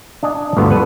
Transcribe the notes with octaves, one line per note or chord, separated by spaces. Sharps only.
D4 D#5 G#5
G1 D2 B2 D3 B3
A4 B4 F#5